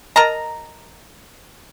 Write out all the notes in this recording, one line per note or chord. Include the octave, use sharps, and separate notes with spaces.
A#4 D#5 A5 A#5